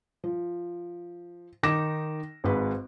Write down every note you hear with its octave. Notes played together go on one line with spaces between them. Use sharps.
F3
D#3 D#4 D6 A#6 E7
G#1 G#2 B4